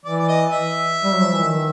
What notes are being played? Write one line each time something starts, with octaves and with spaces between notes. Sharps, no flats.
E3 D5
D5
D#5
E5
G3
F#3
F3
E3
D#3